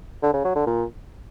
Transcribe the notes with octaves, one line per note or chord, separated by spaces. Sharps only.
D3
C#3
F#3
D3
A#2